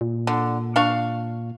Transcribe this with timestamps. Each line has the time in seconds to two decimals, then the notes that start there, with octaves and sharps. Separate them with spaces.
0.01 A#2
0.27 D3
0.76 D4 F5 C#6